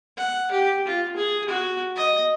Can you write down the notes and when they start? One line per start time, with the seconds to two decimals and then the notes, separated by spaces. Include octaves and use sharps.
0.17 F#5
0.52 G4
0.87 F4
1.16 G#4
1.49 F#4
1.96 D#5